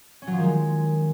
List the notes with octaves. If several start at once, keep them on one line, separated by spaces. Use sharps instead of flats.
C#4
F#3
F3
D#3
G#3